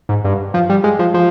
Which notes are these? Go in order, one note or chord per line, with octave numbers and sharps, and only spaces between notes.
G#2
G2
F3
G3
G#3
F3
F3